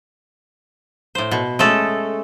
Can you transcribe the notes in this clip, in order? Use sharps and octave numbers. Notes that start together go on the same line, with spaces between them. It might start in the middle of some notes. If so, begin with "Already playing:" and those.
A2 C5
B2
G#3 A3 C#4 A4